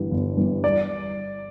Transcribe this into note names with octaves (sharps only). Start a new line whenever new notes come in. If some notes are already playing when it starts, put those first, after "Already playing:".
Already playing: G1 G2 E3 G3 B3
G1
G2 E3 G3 B3
D5